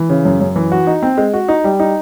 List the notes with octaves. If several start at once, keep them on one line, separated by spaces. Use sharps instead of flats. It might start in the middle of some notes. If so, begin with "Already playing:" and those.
Already playing: E3
C#3
F#2
F#2
E3
F#4
D#4
C4
G#3
F#4
D#4
G3
D#4